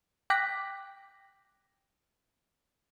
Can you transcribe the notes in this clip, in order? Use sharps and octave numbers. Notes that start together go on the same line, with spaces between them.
G5 D6 F#6 A#6 B6